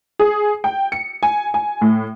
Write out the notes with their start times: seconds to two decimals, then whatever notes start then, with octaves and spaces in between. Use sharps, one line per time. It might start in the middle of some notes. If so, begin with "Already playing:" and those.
0.19 G#4
0.64 G5
0.92 C#7
1.23 G#5
1.54 G#5
1.81 A2